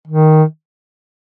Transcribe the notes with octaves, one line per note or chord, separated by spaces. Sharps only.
D#3